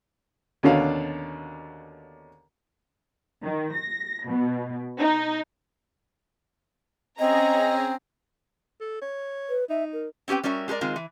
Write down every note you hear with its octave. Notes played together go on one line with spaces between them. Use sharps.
D#2 B2 D3 C#4 D4 F5
D#3
A#6
B2
D#4
C4 C#4 G#4 D#5 A#5
A4
C#5
B4
D#4 E5
A#4
C4 C#4 G4 B4 G5
G3 C#4 F#4 A#4 C#5 E5
G#3 G4 A4 A#4 D5
D#3 G#3 C4 F4 A#4
E3